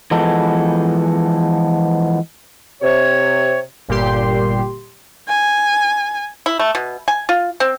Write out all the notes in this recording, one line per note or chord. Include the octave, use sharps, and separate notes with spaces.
E3 F3 G#3 B3 A4
C3 C#5
G1 A#2 G3 G4 C6
G#5
E4
A3
B2
G#5
F4
C4